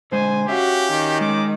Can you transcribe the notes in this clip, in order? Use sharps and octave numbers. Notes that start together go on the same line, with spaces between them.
D3 G#3 C5 G#5
C#4 F#4 G4 E5 F5
D#3
G#3 D6